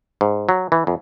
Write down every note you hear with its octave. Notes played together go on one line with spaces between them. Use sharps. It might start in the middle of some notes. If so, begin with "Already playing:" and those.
G#2
F#3
E3
F2